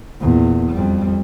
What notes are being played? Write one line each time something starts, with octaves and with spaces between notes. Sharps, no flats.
E2 A#2
F2 G3